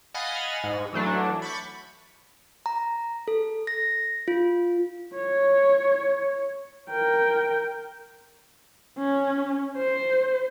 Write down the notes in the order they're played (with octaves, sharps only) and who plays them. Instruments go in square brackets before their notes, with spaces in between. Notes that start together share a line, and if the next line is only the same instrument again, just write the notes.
[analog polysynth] D#5 F5 F#5 G#5 B5 A6
G#2
E3 F#3 A3 D4
B5 C#6 G6 A6 B6 C#7
[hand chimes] A#5
A4
A#6
F4
[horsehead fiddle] C#5
A#4 G5
C#4
C5